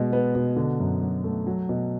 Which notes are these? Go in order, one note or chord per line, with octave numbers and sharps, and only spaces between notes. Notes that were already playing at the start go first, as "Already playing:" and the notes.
Already playing: B2 G#3
B3
B2
D3
F#2
F#3
A3
F#3
B2